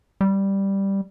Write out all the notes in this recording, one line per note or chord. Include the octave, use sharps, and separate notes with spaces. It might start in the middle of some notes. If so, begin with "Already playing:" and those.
G3